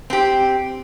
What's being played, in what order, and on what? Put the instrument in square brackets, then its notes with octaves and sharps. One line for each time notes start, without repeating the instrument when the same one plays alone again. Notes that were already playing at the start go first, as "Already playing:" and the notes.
[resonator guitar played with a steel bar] C4 G4